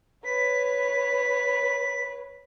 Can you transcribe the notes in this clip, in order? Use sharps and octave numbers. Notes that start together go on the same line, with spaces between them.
B4 C#5 B6